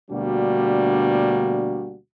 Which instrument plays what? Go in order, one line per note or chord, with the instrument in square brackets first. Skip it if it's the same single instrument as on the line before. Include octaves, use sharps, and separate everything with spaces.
[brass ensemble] D2 B2 G3 A#3 D4 F#4